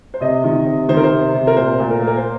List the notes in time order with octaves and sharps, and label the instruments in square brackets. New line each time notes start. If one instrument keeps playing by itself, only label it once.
[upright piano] C5
C3 D#5
D#3
C3
D#3 C5
A#4
C5
C3
C3
A#4
A#2 C5
A#2
A#4
A#3
A#4
C5